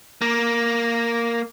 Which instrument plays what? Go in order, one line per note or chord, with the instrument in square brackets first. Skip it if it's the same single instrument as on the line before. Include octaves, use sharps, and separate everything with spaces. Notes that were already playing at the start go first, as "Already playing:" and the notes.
[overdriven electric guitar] A#3